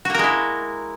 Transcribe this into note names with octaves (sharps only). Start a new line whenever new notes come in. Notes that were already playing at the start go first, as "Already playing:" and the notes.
G#3 A#3 E4 F#4 A#4